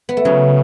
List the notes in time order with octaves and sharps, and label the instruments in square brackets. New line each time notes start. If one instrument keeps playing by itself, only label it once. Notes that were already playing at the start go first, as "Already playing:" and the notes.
[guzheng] B3
A3
[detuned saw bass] C#3 [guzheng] F#3